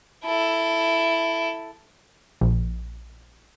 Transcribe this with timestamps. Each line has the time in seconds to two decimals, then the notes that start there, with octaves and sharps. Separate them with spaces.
0.24 E4 A4
2.41 A#1